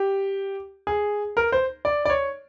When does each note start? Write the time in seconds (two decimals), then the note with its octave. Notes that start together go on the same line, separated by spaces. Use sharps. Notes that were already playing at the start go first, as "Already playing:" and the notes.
Already playing: G4
0.87 G#4
1.37 A#4
1.52 C5
1.85 D5
2.05 D5
2.10 C#5